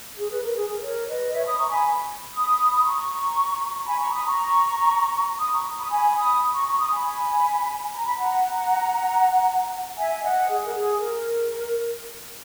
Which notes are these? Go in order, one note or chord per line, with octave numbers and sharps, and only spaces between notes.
G#4
B4
A#4
G#4
A#4
A#4 C#5
B4 D#5
C#5 E5
B5 D#6
A#5 C#6
G#5 B5
B5 D#6
B5
A#5 C#6
A#5
G#5 B5
A#5 C#6
B5 D#6
A#5 C#6
B5 D#6
A#5 C#6
B5 D#6
G#5 B5
B5 D#6
A#5 C#6
A#5 C#6
B5 D#6
G#5 B5
A#5
B5
F#5 A#5
E5 G#5
E5
D#5 F#5
G#4
A#4
G#4
A#4